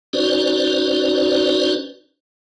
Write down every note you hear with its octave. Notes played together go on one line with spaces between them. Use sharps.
C#4 D#4 F#4 B4 C5 D5